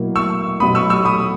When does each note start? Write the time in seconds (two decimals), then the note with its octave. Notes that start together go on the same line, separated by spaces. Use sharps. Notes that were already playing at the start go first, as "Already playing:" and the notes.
Already playing: B2 F#3 A#3 E4
0.15 C#6 E6
0.60 B2 F#3 B3 B5 D#6
0.75 C#6 E6
0.90 C#6 E6
1.05 B5 D#6